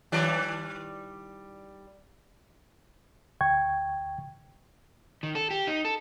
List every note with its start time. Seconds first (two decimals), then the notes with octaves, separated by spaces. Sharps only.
0.12 D#3 G3 D5
3.41 D2 G5 C#6 G#6
5.23 D#3
5.35 A4
5.51 G4
5.67 D#4
5.85 A4